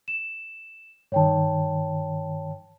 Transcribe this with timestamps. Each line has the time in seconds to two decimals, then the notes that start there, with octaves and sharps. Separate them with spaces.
0.08 E7
1.12 G2 D#3 C#5 G5 A5